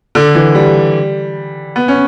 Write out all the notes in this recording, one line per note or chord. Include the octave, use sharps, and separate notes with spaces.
D3
E3
G3
B3
C#4